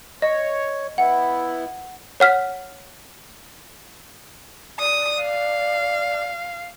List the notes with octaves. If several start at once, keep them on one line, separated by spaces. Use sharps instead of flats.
C#5 D#5
B3 E4 F#5
C#5 F#5 F6 B6
D5 D#6
F5